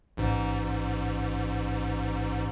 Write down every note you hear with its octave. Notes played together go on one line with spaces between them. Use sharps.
A1 G#2